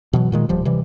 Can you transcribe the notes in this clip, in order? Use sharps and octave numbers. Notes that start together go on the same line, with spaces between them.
B2 E3 F#3
A#2 D#3 G#3
D1 F3 G3
C3 E3 G3